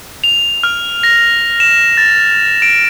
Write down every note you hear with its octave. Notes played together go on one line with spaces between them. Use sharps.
F7
F6
A#6
E7
A6
D7